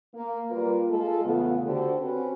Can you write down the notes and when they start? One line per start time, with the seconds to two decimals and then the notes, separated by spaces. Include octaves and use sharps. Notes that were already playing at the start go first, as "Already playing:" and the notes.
0.14 A#3
0.50 G3 A#3 F4 A#4 B4
0.90 G#3 F4 A4
1.24 E2 C#3 A3 B3 F4
1.65 D3 F#4 G4 A4 C5
2.01 C4 C#4 F#4 B4